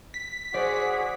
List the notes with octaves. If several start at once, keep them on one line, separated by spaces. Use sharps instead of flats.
B6
F#4 G#4 C5 D5